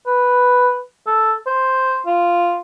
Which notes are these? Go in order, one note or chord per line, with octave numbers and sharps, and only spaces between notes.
B4
A4
C5
F4